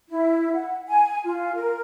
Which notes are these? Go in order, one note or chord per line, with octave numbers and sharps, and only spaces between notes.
E4
F#5
G#5
F4
A#4